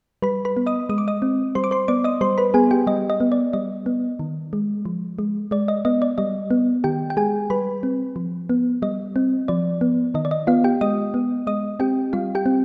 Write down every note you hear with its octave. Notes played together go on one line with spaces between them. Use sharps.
G3 B4 B5
B4 B5
B3
D#5 D#6
G#3 D#6
D6
D#5 D#6
C4
G3 C5 C6
D6
C5 C6
B3 D5 D6
D#5 D#6
G3 C5 C6
B4 B5
B3 G#4 G#5
G4 G5
G3 D#5
D#5
B3
D5
G3 D#5
B3
D#3
G#3
F3
G#3
G#3 D5
D#5
B3 D#5
D5
G3 D#5
B3
D#3 G4 G5
G5
G#3 G#4 G#5
G3 B4 B5
C4
F3
B3
G3 D#5
C4
F3 D5
B3
D#3 D#5
D5
D#5
B3 F4 F5
G4 G5
G#3 D#5 D#6
B3
G#3 D#5 D#6
C4 G4 G5
G3 F4 F5
G4 G5
C4